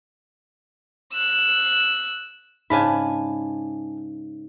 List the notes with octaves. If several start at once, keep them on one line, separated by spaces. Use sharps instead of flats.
E6 F#6
G#2 C#3 D4 G#5 A5 B5